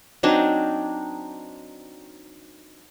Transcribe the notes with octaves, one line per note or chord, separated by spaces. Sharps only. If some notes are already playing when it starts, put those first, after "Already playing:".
F#3 C4 D4 D#4